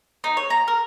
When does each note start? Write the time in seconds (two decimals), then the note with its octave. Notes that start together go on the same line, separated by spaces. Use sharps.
0.24 D#4
0.37 C#5
0.50 A#5
0.68 A#4